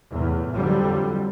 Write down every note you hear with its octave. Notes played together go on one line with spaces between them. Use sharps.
E2 A2
F2 D3 F#3 G3